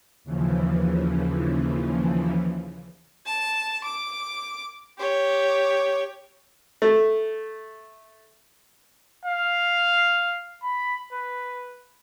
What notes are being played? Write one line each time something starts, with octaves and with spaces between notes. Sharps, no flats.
D#2 C#3 E3 F3
A5
D6
G4 C#5
A3
F5
B5
B4